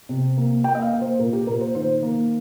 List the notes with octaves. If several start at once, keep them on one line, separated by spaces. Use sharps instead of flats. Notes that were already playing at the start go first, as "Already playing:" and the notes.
C3
A#3
A#3 G5
D#5
F5
A#3
C5
A#2 A#4
G4
A#2 A#4
C5
D#3 C5
A#3